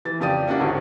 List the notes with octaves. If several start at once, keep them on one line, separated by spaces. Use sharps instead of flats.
E3 A6
F2 C#3 G4 D5 D#6 D#7
A#3 C#4 D4 E4 F#4
G#1 D2 G#2